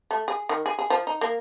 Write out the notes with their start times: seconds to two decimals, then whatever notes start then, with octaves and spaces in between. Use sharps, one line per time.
0.11 A3
0.28 G#4
0.49 D#3
0.66 G#4
0.79 G#4
0.90 F3
1.07 D#4
1.21 A#3